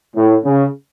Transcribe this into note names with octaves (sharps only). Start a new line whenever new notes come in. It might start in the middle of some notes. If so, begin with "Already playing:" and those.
A2
C#3